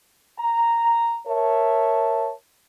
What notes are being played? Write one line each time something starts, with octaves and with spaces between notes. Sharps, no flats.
A#5
A#4 C#5 E5 A5